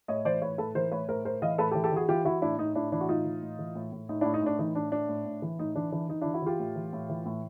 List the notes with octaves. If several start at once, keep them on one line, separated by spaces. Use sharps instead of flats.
A2 C#5 D#5
E3 C5 D5
A2 B4 C#5
A2 A4 B4
E3 A#4 C5
A2 B4 C#5
A2 A#4 C5
A2 A#4 C5
E3 D#5 F5
A2 A4 B4
G4 A4
E3
G4 A4
E3 F#4 G#4
E3 F4 G4
E3 E4 F#4
A2 D4 E4
A2 D#4
A2 D4 E4
E3 D4 E4
F#4
A2 D#4 F4
E3
A2
E3
A2
A2
A2 D#4
D4 E4
A2
D#4
A2 D4
E3 D#4
A2 D4
A2 D4
A2
A2
E3
A2 D#4
E3 D4
E3 D4
E3 D#4
D4 E4
E3
E4 F#4
E3 F4 G4
A2
E3
A2
E3
A2